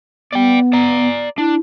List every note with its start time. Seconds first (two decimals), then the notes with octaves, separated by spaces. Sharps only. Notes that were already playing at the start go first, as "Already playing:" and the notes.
0.33 B3 D5 G5
0.73 D5 A#5
1.38 D4 E4